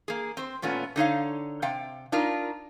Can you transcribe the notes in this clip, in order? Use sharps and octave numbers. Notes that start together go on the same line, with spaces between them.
A#3 G#4
C4 C5
A#2 A3 B3 C#4 F4
D3 D#4 C#5 F5
C3 F5 G5
D4 D#4 F4 A#4